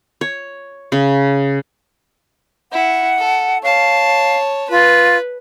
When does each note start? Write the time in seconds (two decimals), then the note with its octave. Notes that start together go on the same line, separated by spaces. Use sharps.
0.21 C#5
0.92 C#3
2.72 E4 F#5
3.18 A4
3.63 C#5 F5 A5
4.70 F4 B4